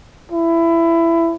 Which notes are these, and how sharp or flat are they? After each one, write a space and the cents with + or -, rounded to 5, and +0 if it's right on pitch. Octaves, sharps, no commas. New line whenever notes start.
E4 +20